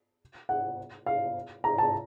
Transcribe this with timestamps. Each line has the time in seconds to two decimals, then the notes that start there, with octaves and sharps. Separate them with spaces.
0.49 F#5
1.06 F5
1.64 A#5
1.78 A5